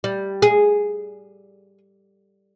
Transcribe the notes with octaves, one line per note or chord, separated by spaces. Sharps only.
G3
G#4